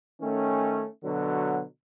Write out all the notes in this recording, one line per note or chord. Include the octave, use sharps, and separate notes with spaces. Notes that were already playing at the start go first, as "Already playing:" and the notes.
D#3 A3 C#4
B2 D3 F#3